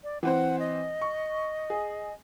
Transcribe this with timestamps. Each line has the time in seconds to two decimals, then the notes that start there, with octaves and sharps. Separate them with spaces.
0.04 D5
0.23 E3 C4 C5 F#5
0.59 D#5
1.02 C#6
1.70 G#4